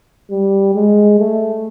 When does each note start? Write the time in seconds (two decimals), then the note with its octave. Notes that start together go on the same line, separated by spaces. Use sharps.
0.30 G3
0.75 G#3
1.19 A3